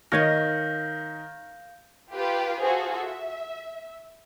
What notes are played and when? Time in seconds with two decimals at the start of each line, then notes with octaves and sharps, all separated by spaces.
0.12 D#3 A#4 C#5 D#5 F5 G6 A#6
2.14 F4 G4 B4
2.62 F4 F#4 G#4 A4 C5
3.00 E5